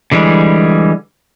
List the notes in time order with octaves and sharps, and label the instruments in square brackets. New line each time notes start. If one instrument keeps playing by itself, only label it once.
[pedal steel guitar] D3 E3 G3 G#3